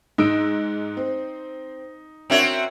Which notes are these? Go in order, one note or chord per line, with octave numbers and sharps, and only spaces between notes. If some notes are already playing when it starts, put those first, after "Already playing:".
G#2 D#4 E6 D7
C4
C4 D4 F#4 A#4 C#5 E5